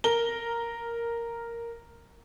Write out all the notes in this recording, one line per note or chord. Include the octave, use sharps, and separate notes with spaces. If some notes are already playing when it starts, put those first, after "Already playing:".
A#4 G7